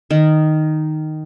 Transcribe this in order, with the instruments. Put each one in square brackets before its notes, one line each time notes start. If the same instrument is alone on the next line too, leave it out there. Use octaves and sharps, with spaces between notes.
[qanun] D#3